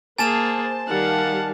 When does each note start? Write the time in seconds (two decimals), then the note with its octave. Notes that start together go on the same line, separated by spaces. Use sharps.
0.18 A#3 G#4 C5 G#5 A5 A6 E7
0.88 D#3 G3 F5 F#5